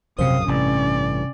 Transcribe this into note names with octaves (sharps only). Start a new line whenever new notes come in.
E1 A#1 F#2 C3 C5 F5 D#6
A1 G2 C3 C#4 D5